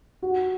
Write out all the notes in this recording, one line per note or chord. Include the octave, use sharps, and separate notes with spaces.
F#4